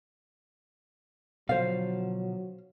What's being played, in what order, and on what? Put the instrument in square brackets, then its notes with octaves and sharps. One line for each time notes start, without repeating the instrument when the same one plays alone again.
[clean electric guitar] B2 D3 F3 [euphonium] F#3 [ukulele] C5 F5